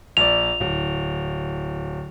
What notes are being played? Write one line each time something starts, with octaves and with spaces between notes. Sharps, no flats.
A#1 D5 F7
D1